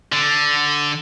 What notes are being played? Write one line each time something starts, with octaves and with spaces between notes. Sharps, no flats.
D3